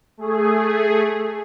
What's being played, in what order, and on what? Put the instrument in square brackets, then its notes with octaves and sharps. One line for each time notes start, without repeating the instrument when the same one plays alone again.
[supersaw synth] A3 G#4